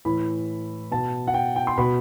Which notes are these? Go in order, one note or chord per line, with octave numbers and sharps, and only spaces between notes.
A2 E3 B5
B2 A5
F#5
G5
G5
C6
B2 B5